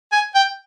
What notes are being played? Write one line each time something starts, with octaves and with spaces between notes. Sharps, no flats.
G#5
G5